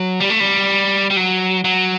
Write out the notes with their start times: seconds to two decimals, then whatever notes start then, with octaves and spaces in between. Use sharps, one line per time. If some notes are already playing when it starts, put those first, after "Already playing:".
Already playing: F#3
0.20 G3
0.30 A3
0.40 G3
1.10 G3
1.16 F#3
1.64 F#3